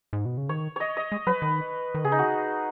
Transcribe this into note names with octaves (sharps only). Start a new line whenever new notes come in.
G#2
B2
C#3
D#3 C#5
C#5 D#5
D#5
G#3
F#3 B4
D#3
D#3
C#3 G#4
D#4
F#4